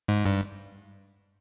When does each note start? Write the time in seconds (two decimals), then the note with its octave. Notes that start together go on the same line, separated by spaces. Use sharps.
0.08 G#2
0.26 G2